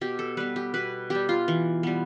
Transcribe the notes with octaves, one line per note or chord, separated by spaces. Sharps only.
B2 G4
A4
G3 B3 B4
G4
B2 B4
G3 B3 G4
F4
E3
G3 B3